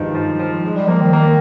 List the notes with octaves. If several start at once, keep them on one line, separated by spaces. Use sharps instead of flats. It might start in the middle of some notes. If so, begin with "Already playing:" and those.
Already playing: G2 D#3 F3 G3 G#3
F3
F3
G#3
G3
F3 A#3
D#3
A#3